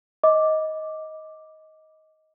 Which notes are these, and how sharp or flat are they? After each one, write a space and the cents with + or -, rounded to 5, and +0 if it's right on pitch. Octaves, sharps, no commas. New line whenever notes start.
D#5 +15 D6 +0